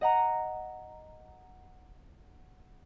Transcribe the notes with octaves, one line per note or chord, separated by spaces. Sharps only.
D#5 F#5 A#5